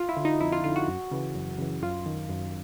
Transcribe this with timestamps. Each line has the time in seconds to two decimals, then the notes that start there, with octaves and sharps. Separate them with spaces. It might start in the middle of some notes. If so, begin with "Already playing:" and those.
Already playing: F4
0.09 E4
0.17 D3
0.25 D#4
0.40 F2 E4
0.52 F4
0.64 D3 F4
0.76 F#4
0.87 F#2
1.11 C#3 E3
1.35 F#2
1.58 C#3 E3
1.82 F#2 F4
2.06 D#3
2.29 F#2